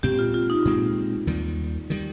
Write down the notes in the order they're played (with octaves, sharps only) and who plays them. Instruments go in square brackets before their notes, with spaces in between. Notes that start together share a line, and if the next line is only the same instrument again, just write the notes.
[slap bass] A#2 G#3 C4 [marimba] G4
[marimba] F4
F4
D#4
[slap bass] A#2 G#3 C4
D#2 D#3 G3
D#3 G3